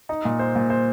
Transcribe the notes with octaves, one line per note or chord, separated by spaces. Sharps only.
D#4
A#2
C5
A#2
C5